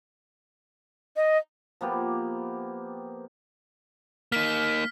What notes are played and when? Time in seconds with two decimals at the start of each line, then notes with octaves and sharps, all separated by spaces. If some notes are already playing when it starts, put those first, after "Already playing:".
1.16 D#5
1.81 F3 A#3 B3 G4
4.32 A#3 D#4 F6 B6